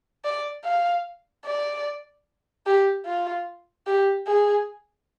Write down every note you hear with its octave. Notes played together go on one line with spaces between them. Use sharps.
D5
F5
D5
G4
F4
G4
G#4